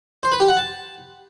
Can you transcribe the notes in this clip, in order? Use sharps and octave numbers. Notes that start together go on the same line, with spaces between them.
C5
B4
G4
F#5
A5